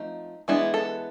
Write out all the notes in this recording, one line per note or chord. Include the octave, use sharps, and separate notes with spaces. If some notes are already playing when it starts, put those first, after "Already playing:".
Already playing: F3 A3 C4 D#4
E3 G#3 B3 D4 E4
A4